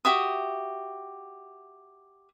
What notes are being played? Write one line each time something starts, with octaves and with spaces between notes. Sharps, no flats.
F#4 G4 E5 D#6